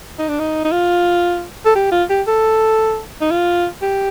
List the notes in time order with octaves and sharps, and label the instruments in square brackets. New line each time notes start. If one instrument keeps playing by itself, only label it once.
[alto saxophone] D#4
D4
D#4
D#4
F4
A4
G4
F4
G4
A4
D#4
F4
G4